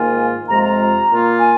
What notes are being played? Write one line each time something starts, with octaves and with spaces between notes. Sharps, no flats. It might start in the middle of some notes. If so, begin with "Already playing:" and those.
Already playing: G#2 D#3 A#3 F4 G#5
F2 C3 G#3 F4 A#5
A#5
A#2 A#3 F4
G#5